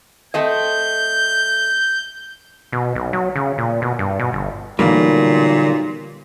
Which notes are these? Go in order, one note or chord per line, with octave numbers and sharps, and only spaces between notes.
A3 C4 D#5 G6
B2
B1
F#3
C#3
A#2
B2
G2
B2
G1
B1 A#2 D3 E3 G3 A#3